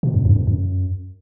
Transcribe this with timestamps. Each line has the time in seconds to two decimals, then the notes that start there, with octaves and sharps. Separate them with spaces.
0.03 B2
0.14 F2
0.25 G2
0.36 F2
0.47 F#2